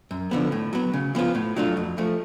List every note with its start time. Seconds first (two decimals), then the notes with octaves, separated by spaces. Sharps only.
0.11 F#2
0.31 D3 F3 B3
0.52 A2
0.73 F#3 B3
0.94 C#3
1.15 F3 B3 F4
1.35 A2
1.56 F#3 A3 D4 F4
1.77 F2
1.98 F3 A3